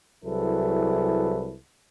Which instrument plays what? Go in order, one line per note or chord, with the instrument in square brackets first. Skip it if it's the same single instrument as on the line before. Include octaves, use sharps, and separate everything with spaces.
[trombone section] C2 F#3 E4 G#4 A4 B4